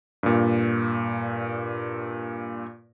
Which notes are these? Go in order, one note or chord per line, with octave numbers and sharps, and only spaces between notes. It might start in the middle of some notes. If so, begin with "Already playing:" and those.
G2 A#2